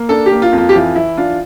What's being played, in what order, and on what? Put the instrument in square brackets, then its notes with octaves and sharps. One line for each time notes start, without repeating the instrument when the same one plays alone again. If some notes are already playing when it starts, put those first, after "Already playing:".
Already playing: [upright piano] A#3
D4 A4
G4
A#3
F4
F2
F4
G4
E3 F4
E3 E4
D4 F4